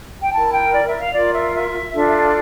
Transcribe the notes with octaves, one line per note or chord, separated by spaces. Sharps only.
G5
E4 A#4 A5
G5
D5
E5
F5
F4 A#4 D5
E5
E5
D4 F4 A4